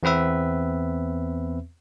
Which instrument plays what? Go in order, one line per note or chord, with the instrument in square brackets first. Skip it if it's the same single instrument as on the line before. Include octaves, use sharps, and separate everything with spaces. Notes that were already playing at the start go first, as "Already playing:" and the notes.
[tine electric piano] E2 B3 C4 B4 E5